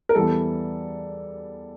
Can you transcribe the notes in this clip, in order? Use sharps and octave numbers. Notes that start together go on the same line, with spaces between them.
A#4
E2 E3 G3 A4